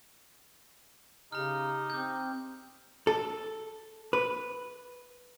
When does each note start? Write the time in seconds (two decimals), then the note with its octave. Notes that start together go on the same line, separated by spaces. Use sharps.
1.32 C#3 D#4 G4 A#5 F6
1.90 C4 D6 G6
3.07 A4
4.13 B4